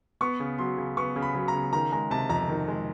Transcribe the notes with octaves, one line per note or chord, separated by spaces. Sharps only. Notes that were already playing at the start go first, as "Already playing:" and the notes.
B3 C#6
C#3
F#3 C6
C#3
B3 C#6
C#3
B5
F#3
A#5
C#3
D#3 A#5
G#3 A#5
C3 A5
F2 A#5
D#3
G#3